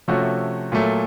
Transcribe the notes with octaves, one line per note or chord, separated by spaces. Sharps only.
C3 F3 A3 C#4 F#4
A#2 F#3 A3